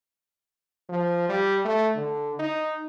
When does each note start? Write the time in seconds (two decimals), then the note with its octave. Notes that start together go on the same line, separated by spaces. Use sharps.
0.89 F3
1.29 G3
1.65 A3
1.96 D3
2.39 D#4